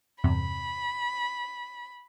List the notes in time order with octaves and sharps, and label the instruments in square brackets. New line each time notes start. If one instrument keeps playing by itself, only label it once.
[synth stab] E2 G2 C3 [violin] B5